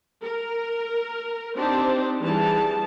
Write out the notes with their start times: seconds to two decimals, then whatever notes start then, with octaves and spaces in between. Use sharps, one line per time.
0.22 A#4
1.56 C4 D4 D#4 G4 C5
2.21 E3 G3 G#4 A5